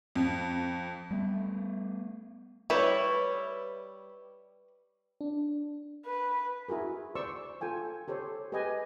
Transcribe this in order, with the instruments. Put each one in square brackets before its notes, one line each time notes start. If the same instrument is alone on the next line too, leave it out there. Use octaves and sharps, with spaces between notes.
[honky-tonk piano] F2
[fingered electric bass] G3 A3 B3
[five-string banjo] G3 E4 [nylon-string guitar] B4 C#5
[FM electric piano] D4
[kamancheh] B4
[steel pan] E4 F#4 G#4 A#4
C5 D5 C6 C#6 E6
F4 A4 G5 G#5
G4 A4 C5 C#5
G4 G#4 B4 D#5 G5 G#5